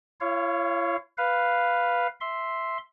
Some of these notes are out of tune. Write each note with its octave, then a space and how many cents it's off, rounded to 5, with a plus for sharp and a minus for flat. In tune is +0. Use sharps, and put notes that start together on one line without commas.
E4 +45 C#5 +0 F5 -10
B4 +0 F5 +0
E5 +0 C6 +0